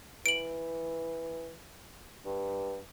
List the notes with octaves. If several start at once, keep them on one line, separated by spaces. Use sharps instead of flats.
E3 D7 F#7
G2